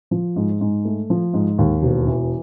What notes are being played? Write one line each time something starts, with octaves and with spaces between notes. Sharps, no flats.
F3
G#2
G#2
A3
F3
G#2
D#2
E1
E3